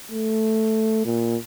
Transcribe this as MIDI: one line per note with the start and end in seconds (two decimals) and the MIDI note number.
0.11 1.02 57
1.05 1.36 46